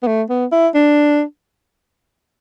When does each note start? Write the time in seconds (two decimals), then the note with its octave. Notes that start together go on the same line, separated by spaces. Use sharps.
0.03 B3
0.07 A3
0.30 B3
0.52 E4
0.75 D4